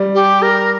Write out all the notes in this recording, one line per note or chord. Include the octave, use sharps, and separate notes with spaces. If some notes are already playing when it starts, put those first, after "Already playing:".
Already playing: G3
G4
A#4